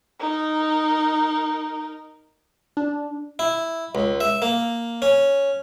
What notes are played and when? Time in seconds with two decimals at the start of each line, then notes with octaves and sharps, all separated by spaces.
0.20 D#4 A#4
2.77 D4
3.39 E4
3.95 C#2
4.21 E5
4.42 A#3
5.02 C#4